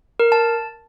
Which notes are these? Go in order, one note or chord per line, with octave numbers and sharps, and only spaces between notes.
A#4
A5